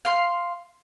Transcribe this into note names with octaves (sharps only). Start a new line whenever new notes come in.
F5 C6